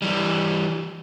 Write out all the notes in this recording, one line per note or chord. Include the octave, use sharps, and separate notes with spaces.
E3 G3